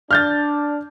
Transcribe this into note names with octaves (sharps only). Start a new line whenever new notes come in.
D4 F6 G6 A6